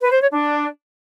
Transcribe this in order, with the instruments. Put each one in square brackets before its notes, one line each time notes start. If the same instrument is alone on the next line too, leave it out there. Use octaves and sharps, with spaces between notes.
[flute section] B4
C5
C#5
D4